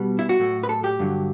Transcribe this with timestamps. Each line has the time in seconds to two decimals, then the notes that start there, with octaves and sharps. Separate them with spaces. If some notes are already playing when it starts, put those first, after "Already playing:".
Already playing: B2 G3 B3
0.19 E4
0.29 F#4
0.39 A2 F#3 A3
0.63 B4
0.69 A4
0.84 G4
0.99 G2 D3 F#3